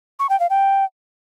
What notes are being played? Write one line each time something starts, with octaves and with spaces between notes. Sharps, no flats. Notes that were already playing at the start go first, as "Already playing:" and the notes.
C#6
G5
F5
G5